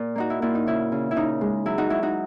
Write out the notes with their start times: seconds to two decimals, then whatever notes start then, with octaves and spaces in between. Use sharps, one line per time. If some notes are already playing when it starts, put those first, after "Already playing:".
Already playing: A#2
0.16 A#3 D#4 F#4
0.30 E4
0.42 A#2 E4
0.55 D#4
0.67 C#3 E4
0.92 C#3
1.11 E4
1.16 C#3 D#4
1.41 G#3
1.66 F#3 E4
1.78 D#4 F#4
1.90 F#3 E4
2.02 D#4 F#4